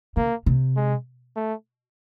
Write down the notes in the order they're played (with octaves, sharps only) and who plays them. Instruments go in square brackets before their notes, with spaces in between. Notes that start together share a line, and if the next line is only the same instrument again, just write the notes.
[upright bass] C#3 [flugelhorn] A#3
[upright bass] C3
[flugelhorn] G#3
A3